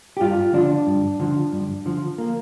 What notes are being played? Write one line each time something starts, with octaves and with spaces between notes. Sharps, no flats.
G4
G2 F4
D3 F3 D4
G2
D3 F3
G2
D3 F3
A#3